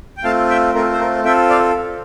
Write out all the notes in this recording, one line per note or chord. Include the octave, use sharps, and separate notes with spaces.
G5
A3 C4 F4 F5 A5
E5 G5
A3 C4 F4 A#4
C5
A#4
C4 F4 A4 E5 G5
D5 F5